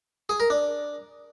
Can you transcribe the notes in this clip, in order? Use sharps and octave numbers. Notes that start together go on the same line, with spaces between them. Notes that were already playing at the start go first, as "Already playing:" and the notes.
G#4
A#4
D4